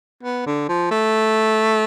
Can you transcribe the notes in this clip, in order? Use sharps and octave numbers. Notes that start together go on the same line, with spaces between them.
B3
D3
F3
A3